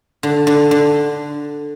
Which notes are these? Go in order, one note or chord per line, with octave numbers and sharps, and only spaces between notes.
D3
D3
D3